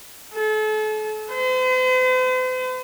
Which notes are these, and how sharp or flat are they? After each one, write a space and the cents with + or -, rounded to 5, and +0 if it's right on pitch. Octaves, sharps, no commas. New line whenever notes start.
A4 -40
C5 -45